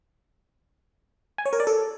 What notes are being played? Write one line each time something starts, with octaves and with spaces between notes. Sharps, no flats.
G#5
C#5
A#4
D5
A4